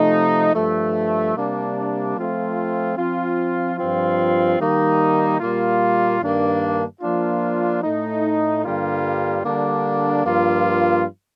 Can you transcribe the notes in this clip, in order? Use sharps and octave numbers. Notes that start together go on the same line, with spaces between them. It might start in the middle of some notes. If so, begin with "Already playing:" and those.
Already playing: C3 F3 A3 D#4
G2 F3 A3
C3 G3 A#3 D4
F3 A3 C4 F4
F3 C4 F4
G2 F3 C4 F4
D#3 G3 A#3 D#4
A#2 G3 A#3 F4
G2 D#3 A#3 D4
F3 A#3 D4 F4
A2 A3 D#4
G2 D3 G3 A#3 F4
D3 G3 A#3 D4
G2 F3 A#3 F4